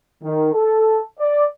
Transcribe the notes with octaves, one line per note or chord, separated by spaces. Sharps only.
D#3
A4
D5